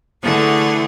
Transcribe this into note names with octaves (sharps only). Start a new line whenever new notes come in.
D3 E3 A3 G#4 F#5